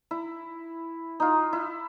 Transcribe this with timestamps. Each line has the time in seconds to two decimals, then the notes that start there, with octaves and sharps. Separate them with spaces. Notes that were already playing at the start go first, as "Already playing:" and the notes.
0.11 E4
1.20 D#4 F4
1.53 E4